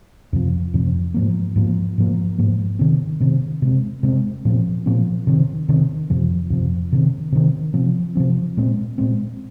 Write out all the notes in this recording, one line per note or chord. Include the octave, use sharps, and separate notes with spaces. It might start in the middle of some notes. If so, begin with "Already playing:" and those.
F2 C3 F3
F2 C3 F3
G#2 F3 A#3
G#2 F3 A#3
G#2 F3 A#3
G#2 F3 A#3
C3 D#3 C4
C3 D#3 C4
C3 G#3 C4
C3 G#3 C4
A#2 F3 C4
A#2 F3 C4
C3 D#3 C4
C3 D#3 C4
F2 C3 F3
F2 C3 F3
C3 D#3 C4
C3 D#3 C4
C3 F3 C4
C3 F3 C4
A#2 G#3 C4
A#2 G#3 C4